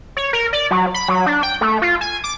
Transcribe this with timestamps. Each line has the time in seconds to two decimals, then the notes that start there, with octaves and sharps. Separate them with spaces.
0.17 C#5
0.33 A#4
0.53 D5
0.71 F#3
0.94 B5
1.09 F#3
1.26 D4
1.43 G5
1.61 A3
1.82 F4
2.01 G#5
2.24 D6